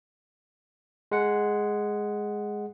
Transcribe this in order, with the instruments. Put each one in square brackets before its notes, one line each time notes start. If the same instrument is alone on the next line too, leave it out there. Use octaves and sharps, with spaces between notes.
[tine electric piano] G#3 F#5